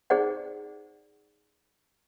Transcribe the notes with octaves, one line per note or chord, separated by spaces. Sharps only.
D#4 G#4 C5 D5 F#5